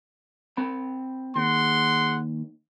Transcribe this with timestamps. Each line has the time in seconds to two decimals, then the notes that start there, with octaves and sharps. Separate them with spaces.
0.57 C4 B5
1.36 D#2 G#4 F#5 C6